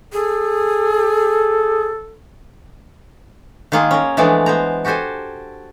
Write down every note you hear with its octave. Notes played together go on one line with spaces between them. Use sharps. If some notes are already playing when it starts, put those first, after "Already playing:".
G#4 A4
D#3 G#3 A#3 F4 G#4
C#4 A#4
E3 F3 G#3 A3 B3 D4
B3 C5 A#5
F#4 G4 A4 C5 G#5